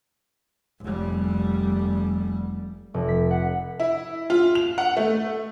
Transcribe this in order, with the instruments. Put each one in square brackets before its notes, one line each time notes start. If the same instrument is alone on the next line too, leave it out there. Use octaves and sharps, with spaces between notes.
[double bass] F1 G3
[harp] F1
B6
F#5
[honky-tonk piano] E4
F4
F7
F#5
A3